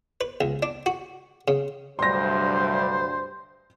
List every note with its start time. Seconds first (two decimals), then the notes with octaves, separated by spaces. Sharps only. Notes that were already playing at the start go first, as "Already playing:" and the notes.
0.21 B4
0.41 C#2
0.63 D4
0.86 F#4
1.48 C#3
1.99 D2 G2 C3 F#3 G3 C5 C6 A#6